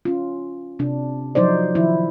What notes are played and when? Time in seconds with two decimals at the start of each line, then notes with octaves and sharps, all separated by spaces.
0.05 C#4 F4
0.79 C3 D4
1.35 F3 F#3 D#4 C5 D5
1.75 D#3 F3 E4